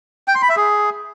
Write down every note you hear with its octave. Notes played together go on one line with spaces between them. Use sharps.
G5
C6
B5
E5
G#4